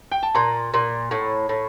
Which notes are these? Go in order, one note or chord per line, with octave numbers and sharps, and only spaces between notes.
G5
A5
A#2 A#5
A#2
A2
A2